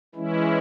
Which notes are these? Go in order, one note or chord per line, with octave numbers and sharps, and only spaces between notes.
E3 G#3 C#4 E4